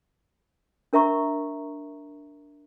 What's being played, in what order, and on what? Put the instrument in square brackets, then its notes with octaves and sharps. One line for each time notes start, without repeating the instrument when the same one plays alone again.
[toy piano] D4 A#4 E5 A#5 C#6